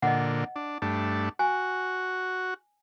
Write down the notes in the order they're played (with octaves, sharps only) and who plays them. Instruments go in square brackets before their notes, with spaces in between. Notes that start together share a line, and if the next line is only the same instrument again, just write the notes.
[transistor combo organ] A#2 D3 [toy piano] D#5 F#5
[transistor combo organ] D4
G2 A3 D4
[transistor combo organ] F#4 [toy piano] G#5